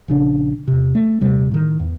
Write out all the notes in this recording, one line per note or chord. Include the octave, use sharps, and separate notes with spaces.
A#1 C#3 D4
E2 C3
A3
D#1 C3 G3
A2 D#3
E2